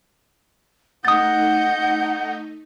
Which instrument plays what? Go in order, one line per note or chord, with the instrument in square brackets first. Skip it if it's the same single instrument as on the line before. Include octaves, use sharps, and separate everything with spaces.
[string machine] A3 D#4 [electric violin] D#5 G6 [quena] F#5 [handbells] D#6 A6